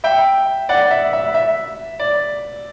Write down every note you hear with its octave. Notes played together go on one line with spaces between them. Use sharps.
E5 G5
D5 F#5
E5
E5
E5
D5